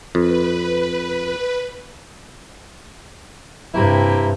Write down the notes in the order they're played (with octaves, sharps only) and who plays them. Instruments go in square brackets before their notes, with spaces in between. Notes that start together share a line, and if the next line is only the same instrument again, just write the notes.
[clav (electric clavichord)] F2 [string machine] B4
[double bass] G2 C3 [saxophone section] A#3 E4 G4